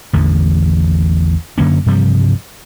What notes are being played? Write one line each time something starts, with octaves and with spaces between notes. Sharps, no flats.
A1 E2 D3
F#2 D3 A#3 C#4
G2 C3 F3 G3